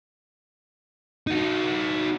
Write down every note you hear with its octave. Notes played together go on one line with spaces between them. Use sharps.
D#4 F#4